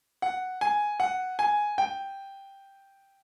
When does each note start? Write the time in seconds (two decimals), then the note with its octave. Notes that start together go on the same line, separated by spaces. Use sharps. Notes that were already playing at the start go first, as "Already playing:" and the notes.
0.22 F#5
0.61 G#5
1.00 F#5
1.39 G#5
1.78 G5